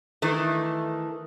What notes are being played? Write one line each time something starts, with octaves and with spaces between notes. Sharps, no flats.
D#3 E3 A3